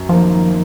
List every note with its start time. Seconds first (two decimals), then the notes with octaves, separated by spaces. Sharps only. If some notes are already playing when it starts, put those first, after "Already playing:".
Already playing: F#2
0.09 D#3 F3 A#3